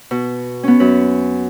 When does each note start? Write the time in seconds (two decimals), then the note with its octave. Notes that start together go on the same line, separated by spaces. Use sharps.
0.11 B2
0.63 B3 C#4
0.80 F#2 B4